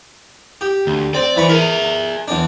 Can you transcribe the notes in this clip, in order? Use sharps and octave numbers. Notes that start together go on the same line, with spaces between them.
G4
D2
C4 D5
E3 B5 C#6
G#4 A#4 E5
E2 D4